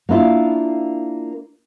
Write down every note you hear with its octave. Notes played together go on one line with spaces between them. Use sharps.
A#3 D4 E4 F4